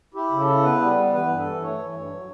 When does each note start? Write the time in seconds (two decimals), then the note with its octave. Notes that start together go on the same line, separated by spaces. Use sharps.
0.14 E4 G4
0.31 C#3
0.40 A4
0.47 E4
0.63 B3 B4
0.80 G3
0.97 B3
1.13 E3 B4
1.29 G2
1.37 A4
1.45 E3
1.62 A3 C#5
1.79 E3
1.94 G2
2.11 F#3